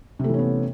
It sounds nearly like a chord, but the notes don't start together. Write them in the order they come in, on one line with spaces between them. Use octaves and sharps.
C3 A3 E3 C#4 B3